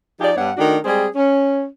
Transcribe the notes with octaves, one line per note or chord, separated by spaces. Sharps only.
F3 D#4 G4 G#4 D5
G2 B3 D4 C#5 F#5
D#3 A3 D4 F#4 A#4
G3 G#3 C4 G#4
C#4